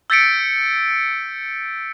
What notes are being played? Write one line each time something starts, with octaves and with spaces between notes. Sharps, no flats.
E6 G6 A6 B6 C#7 D7